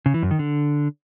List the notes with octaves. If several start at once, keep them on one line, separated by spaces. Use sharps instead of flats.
C#3
E3
F#2
D#3
D3